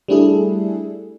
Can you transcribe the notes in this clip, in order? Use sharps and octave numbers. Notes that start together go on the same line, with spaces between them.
G3 A3 D4 E4 G#4 A4